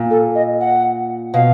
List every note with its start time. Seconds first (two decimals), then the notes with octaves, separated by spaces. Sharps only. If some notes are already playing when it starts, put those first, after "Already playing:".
Already playing: A#2
0.10 A4
0.35 D#5
0.60 F#5
1.34 B2 F5